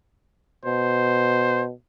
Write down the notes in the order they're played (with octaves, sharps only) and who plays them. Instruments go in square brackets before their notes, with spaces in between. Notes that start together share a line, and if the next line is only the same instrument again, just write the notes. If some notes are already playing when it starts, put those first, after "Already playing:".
[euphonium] B2 [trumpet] C5